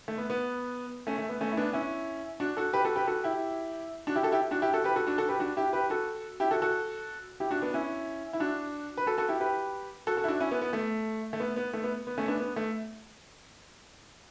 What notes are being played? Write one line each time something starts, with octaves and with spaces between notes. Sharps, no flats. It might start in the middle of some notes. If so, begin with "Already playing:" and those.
A3
B3
B3
A3 C#4
A3
B3
A3 C#4
E4
B3 D4
C#4 E4
D4 F#4
F#4 A4
G4 B4
F#4 A4
G4 B4
F#4 A4
E4 G4
D4 F#4
E4 G4
F#4 A4
E4 G4
D4 F#4
E4 G4
F#4 A4
G4 B4
F#4 A4
D4 F#4
F#4 A4
G4 B4
D4 F#4
E4 G4
G4 B4
F#4 A4
E4 G4
F#4 A4
F#4 A4
E4 G4
D4 F#4
B3 D4
C#4 E4
E4
D4 F#4
B4
F#4 A4
F#4 A4
E4 G4
G4 B4
F#4 A4
F#4 A4
E4
D4 F#4
C#4 E4
B3
B3
A3
A3
B3
B3
A3
B3
B3
A3 C#4
B3 D4
B3
A3